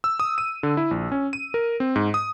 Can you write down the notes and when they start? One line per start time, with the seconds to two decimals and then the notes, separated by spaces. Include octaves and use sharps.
0.04 E6
0.20 D#6
0.38 D#7
0.63 D3
0.77 E4
0.91 A#1
1.12 C#4
1.33 D#7
1.54 A#4
1.80 C4
1.96 G#2
2.14 D#6